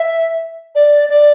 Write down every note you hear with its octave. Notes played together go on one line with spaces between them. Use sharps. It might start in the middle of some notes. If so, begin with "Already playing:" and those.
Already playing: E5
D5
D5